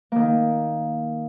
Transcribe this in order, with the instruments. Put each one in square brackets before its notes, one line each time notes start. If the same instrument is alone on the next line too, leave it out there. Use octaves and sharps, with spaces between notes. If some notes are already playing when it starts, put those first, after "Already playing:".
[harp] D#3 A#3